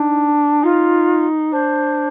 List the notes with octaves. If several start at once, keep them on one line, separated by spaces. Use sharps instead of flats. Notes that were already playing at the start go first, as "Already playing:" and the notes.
Already playing: D4 D#4
D#4 F4
D4 C5